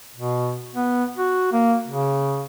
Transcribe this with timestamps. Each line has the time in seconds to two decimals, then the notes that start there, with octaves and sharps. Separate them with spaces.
0.17 B2
0.75 B3
1.17 F#4
1.53 A#3
1.87 C#3